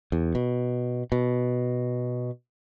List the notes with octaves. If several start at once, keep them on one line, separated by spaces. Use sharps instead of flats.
E2
B2
B2